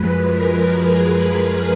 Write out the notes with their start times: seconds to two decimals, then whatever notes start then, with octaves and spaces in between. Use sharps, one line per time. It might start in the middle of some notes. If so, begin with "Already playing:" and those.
Already playing: F#2 F3 G#3 B4
0.28 A#4
0.74 G#4
1.05 A#4
1.36 A#4